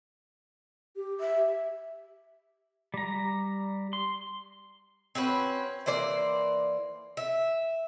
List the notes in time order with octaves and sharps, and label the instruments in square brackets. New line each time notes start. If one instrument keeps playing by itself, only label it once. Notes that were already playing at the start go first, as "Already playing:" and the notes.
[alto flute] G4
[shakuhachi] E5
[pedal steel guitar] G3 A#5
C6
[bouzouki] C4 C#4 F#4 B4
E3 A#3 C5 D5
E5